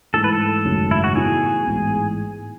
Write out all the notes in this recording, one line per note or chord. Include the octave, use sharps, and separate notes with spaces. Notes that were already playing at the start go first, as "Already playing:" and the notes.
G#2 E3 A3 A4
B4
A4
G#1 F#2 C#3 F#3 A3
E4
F#4
A2 E3 B3 D#4 F#4 G#4
A1 G#2 E3 B3